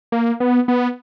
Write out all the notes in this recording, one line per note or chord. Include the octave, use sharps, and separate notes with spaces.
A#3
B3
B3